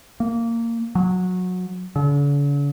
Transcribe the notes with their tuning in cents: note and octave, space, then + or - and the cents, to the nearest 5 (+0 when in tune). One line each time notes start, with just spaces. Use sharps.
A#3 -15
F#3 -20
D3 -45